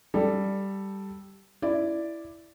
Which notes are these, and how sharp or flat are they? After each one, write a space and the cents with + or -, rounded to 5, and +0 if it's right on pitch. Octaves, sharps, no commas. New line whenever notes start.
G3 +0 A4 +0
E4 +5 D5 +0